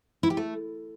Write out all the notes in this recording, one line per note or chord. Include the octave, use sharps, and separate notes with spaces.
E4
G4
A3